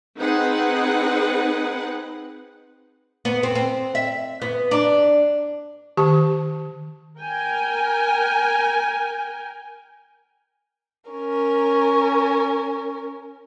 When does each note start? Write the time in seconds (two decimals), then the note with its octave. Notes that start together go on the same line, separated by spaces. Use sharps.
0.18 C4 D#4 G#4 B4 F#5
3.25 B3
3.43 C4
3.55 C4
3.95 E5
4.42 B3
4.71 D4
5.97 D#3 G4 A5
7.18 A#4 G5 G#5
11.10 C#4 A#4